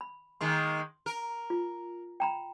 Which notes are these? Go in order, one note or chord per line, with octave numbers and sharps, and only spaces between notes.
B5
D#3 G#3 A#3 C6
A#4
F4
G5 A#5 B5